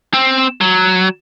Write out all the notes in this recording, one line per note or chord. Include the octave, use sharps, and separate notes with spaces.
C4
F#3